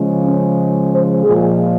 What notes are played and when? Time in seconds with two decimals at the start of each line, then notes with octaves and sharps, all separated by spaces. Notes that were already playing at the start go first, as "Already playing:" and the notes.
Already playing: C#3 F3 G#3
0.22 C#4
0.90 C5
1.23 A#2 F3 G#3 G#4